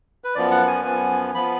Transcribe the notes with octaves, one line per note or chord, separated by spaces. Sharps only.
B4
F#2 F3 B3 D5
F#5
G#5
F#2 F3 B3 G#5
F3 B3 B5